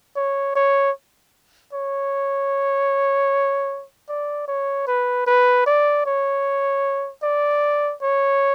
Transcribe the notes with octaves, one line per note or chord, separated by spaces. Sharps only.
C#5
C#5
C#5
D5
C#5
B4
B4
D5
C#5
D5
C#5